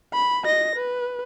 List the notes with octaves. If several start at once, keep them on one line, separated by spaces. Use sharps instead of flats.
B5
D#5 A#6
B4